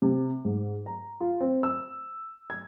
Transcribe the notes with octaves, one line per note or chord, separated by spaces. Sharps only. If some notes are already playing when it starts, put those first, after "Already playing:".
C3
G#2
A#5
F4
C4
E6
G#6